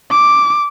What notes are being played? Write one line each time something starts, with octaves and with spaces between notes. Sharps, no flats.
D6